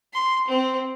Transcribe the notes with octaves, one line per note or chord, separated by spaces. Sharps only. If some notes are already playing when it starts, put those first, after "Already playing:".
C6
C4